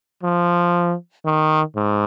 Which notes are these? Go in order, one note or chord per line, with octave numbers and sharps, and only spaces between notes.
F3
D#3
G#2